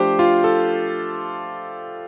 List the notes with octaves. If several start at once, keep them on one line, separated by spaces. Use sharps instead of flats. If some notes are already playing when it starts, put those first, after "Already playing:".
Already playing: F3 A3 D4 G4 C5
F4
A4